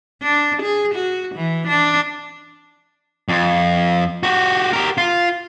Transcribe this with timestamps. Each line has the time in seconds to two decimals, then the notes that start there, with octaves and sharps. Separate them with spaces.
0.22 D4
0.62 G#4
0.95 F#4
1.35 E3
1.68 D4
3.29 F2
4.23 F#4 G4
4.73 G4 A#4
4.98 F4